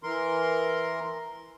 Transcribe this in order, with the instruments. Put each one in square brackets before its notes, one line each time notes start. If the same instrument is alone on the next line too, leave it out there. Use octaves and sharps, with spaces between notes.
[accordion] E3 A#4 C6